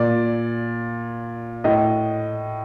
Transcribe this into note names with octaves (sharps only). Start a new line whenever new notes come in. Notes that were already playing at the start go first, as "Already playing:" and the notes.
Already playing: A#2 D5
A2 D#5